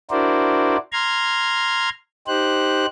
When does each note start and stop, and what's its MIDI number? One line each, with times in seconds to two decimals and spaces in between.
0.11 0.77 62
0.11 0.77 64
0.11 0.77 66
0.11 0.77 70
0.11 0.77 72
0.11 0.77 74
0.93 1.89 82
0.93 1.89 84
0.93 1.89 89
0.93 1.89 92
2.28 2.86 63
2.28 2.86 67
2.28 2.86 72
2.28 2.86 90